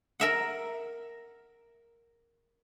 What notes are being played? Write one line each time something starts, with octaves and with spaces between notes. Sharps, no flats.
A#4 E5 F#5